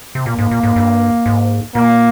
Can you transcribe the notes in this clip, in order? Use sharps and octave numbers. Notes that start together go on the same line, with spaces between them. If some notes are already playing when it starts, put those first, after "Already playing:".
C3
A#2 A#3
G#2
A#2
G#2
G2
G#2
A#2 A#3